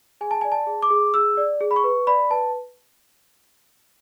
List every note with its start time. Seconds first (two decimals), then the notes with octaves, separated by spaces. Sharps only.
0.21 G#4 G#5
0.31 A5
0.41 D5 G#5
0.52 A5
0.67 G#4
0.82 D6
0.90 G#4
1.14 G#4 E6
1.37 D5
1.61 G#4
1.71 B5
1.76 C#6
1.84 B4
2.07 D5 B5
2.30 B4 A5